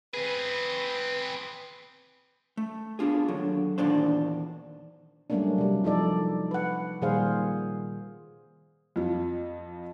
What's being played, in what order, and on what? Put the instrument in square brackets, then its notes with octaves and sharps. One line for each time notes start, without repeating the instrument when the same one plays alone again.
[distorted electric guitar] C4 G#4 [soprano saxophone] B4
[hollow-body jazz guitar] A3
B3 D4 F4 G#4
D#2 D3 F#3
E2 A#2 D#3 D4 C5
[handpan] F#3 G3 A3 A#3 C#4 D4
C3 G3
F3 D#4 A4 D5
B4 F#5
A#2 D#3 G3 G#4 C5 F5
[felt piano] F2 F3